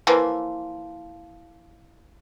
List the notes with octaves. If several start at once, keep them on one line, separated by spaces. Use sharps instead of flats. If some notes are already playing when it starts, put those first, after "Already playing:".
E3 F3 A#3